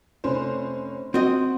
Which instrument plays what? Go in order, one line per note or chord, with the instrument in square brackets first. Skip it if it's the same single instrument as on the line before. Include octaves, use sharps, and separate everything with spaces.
[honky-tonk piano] F1 C#4 C5
[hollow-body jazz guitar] C4 D#5 [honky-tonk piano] F#4